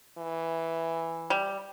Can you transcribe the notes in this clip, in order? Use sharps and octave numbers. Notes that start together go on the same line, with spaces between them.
E3
G3